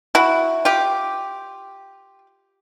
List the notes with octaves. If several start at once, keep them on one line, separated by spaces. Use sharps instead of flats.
E4 F#4
F4 G4